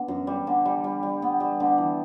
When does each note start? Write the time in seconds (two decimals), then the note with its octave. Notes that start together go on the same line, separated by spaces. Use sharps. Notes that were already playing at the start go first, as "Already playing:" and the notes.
Already playing: D3 B3
0.08 F#2
0.27 G3
0.47 D3
0.66 G3
0.84 G3
1.03 G3
1.22 B3
1.40 G3
1.60 D3
1.78 E3